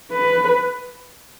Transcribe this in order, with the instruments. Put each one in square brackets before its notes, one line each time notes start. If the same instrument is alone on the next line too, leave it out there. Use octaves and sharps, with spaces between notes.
[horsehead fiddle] B4